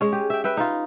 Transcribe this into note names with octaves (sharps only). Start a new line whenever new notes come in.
G#3 C#4
G4
E5 G5
B4 E5 G5
D#4 F4